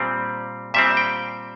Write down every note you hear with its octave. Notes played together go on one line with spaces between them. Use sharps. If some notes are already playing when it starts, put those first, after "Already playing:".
Already playing: A#2 G3 C4
A#2 G3 C4 E5
G5